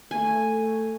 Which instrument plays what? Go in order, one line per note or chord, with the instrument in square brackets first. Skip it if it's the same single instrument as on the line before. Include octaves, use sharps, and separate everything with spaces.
[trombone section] A3 [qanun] G#5